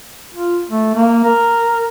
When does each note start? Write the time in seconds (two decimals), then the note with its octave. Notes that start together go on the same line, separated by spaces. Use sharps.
0.34 F4
0.70 A3
0.95 A#3
1.24 A#4